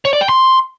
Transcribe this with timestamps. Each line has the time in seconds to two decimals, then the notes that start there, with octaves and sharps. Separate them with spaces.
0.05 C#5
0.13 D5
0.21 G5
0.29 C6